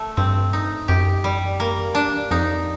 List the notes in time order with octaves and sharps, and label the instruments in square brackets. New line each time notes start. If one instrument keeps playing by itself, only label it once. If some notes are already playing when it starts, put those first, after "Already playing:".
Already playing: [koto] A3
[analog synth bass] G2 [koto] C4
[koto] D#4
[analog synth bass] F#2 [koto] G4
[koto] G3
A#3
D4
[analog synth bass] F2 [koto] D#4